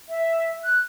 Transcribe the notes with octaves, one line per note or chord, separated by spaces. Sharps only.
E5
F#6